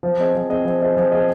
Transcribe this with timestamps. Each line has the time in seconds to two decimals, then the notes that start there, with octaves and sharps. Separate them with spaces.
0.03 F3
0.19 C4 G#4 D#5
0.35 F3
0.50 C4 G#4 D#5
0.65 F3
0.80 C4 G#4 D#5
0.97 F3
1.12 C4 G#4 D#5